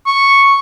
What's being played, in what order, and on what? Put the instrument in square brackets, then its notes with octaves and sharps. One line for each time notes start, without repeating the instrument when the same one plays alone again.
[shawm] C#6